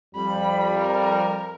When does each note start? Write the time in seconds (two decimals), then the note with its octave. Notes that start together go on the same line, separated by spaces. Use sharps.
0.16 F2 G3 B5
0.78 A#4